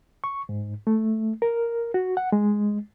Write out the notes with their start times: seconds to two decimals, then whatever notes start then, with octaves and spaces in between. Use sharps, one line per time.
0.24 C#6
0.49 G#2
0.87 A3
1.42 A#4
1.94 F#4
2.17 F#5
2.32 G#3